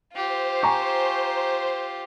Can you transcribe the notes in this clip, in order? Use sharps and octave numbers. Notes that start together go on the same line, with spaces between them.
F4 G4 C5
G#5 A#5 C#6